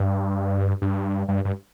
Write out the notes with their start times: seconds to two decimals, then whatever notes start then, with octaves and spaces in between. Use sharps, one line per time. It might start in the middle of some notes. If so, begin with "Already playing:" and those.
Already playing: G2
0.82 G2
1.28 G2
1.45 G2